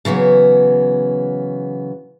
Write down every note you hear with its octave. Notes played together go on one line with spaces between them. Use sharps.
C#3 E3 F#3 B3